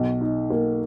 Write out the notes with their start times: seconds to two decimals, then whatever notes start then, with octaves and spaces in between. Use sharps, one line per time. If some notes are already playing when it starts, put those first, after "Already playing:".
Already playing: B1
0.21 D#4
0.50 A#3